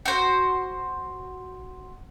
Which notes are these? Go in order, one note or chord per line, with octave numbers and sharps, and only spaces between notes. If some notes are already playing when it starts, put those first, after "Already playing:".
F#4 C5